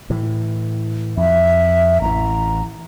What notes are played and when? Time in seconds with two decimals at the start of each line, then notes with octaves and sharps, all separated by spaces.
0.10 A2 E3
1.17 F2 E5
2.02 A1 E3 A#5